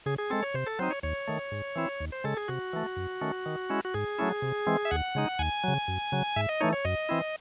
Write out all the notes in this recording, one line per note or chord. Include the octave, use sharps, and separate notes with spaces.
C#3 G#4
G#4
G#3 C4 A4
C#5
C3 C5
A4
F#3 C4 D#4 C5
C#5
D#2 C#5
D#3 A3
G#2
E3 C4 E4
D#2
C5
C#3 G#3 A4
G#4
C3 F#4
E3 A3
F#2
D#3 A3 C#4
D#3
G#3 C#4 E4
F#4
G#2 G#4
F#3 A3 C#4 E4
C3
E3 G#3 C4
E5
D#2 F#5
C#3 G#3 D#4
D#2 G#5
C#3 F#3
F#2
C#3 F#3
G#2 E5
D#5
E3 A3 D#4 C#5
C#5
F#2 D#5
E3 C4 E4